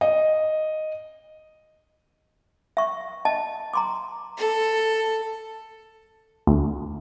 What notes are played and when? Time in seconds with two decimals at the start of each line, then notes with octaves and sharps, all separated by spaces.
0.01 D#5
2.77 E5 C#6
3.25 D#5 A5
3.74 A#5 C6 D6
4.37 A4
6.47 D2